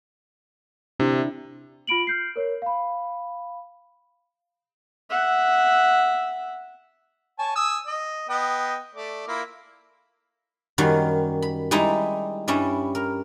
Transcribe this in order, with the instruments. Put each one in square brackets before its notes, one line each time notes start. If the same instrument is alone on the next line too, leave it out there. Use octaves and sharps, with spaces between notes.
[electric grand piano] C3 [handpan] D4 E4
[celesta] F4 B5 D7 F#7
F6 G6 C7
A#4 C#5
F5 B5
[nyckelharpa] E5 F#5
[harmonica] C#5 G#5 A5
G#5 D#6 E6
D#5
B3 D#5 G5
A3 D5
A#3 E4 F4
[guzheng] F#2 D#3 F#3 G3
B5
G3 G#3 D#4 E4
G2 G3 C#4 E4
A#4